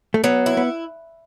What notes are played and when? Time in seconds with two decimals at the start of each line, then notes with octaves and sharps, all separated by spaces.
0.14 A3
0.24 F#3 B3
0.46 E4
0.57 B3